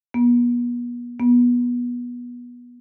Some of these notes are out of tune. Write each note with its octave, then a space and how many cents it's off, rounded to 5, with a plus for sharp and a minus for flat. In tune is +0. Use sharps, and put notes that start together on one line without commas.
B3 -35
B3 -20